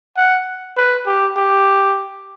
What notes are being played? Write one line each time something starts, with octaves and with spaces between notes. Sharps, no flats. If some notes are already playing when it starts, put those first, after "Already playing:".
F#5
B4
G4
G4